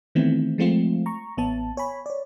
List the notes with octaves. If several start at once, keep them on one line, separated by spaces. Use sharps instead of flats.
D#3 E3 A3 B3 C4 E4
F3 G#3 A3 C4 F4
A#5 C#6
A1 B3 A5
C#5 G#5 B5
C#5 D5